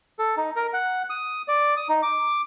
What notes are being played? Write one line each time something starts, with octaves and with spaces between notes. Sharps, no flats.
A4
D#4
A#4
F#5
D#6
D5
D#6
D#4
D6